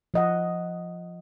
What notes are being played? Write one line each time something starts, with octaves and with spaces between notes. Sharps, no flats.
F3 D#5 F#5